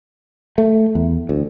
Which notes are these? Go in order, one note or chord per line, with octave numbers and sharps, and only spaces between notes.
A3
E2
D2